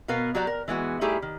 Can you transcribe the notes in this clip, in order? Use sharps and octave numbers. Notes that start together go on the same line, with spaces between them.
B2 B3 A#4 B4 F5
F#3 F#4 G4 D5 A#5
A#4
E3 G#3 B3 F#4
G3 A3 D#4 E4 G4 G#4
D#3